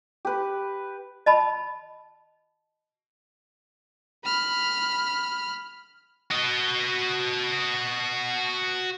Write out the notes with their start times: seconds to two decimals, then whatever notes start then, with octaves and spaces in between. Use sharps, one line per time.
0.25 G4 B4
1.26 D#5 A5 B5
4.24 B5 F6
6.31 F#4 D#5